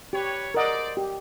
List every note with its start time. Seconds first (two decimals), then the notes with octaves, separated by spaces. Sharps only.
0.13 G4 B4 C#5
0.54 A#4 C5 D5 D#5 F#5
0.97 G4